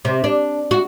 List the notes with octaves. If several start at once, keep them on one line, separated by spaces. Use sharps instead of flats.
C3
D4
F#4